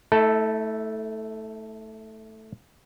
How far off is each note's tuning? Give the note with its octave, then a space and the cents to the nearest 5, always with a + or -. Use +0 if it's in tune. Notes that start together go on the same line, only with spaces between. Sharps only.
A3 +0 E4 -40 A4 +0